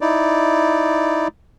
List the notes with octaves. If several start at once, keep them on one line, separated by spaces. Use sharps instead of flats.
D#4 E4 D5